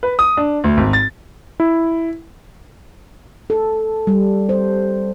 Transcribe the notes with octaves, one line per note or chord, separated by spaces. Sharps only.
B4
D#6
D4
D2
G#1
A6
E4
A4
G3
C5